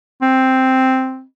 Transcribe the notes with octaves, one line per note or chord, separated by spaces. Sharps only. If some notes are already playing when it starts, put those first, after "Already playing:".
C4